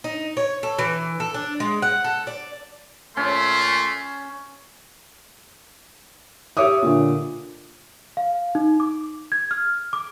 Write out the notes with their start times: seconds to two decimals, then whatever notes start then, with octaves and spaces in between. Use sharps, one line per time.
0.04 D#4
0.37 C#5
0.63 A4
0.79 E3
1.20 A4
1.34 D4
1.60 G#3
1.82 F#5
2.04 A4
2.27 D5
3.17 A#2 A3 C#4 C6
6.57 G4 C#5 E5 D6 D#6
6.83 A#2 D3
8.17 F5
8.55 D#4
8.80 D6
9.32 G#6
9.51 F6
9.93 D6